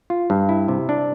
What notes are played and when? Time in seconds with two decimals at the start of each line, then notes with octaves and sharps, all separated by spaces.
0.10 F4
0.30 G2
0.49 E4
0.68 C3
0.89 D4